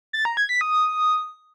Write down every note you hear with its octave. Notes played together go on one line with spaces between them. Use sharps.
A6
A#5
G#6
B6
D#6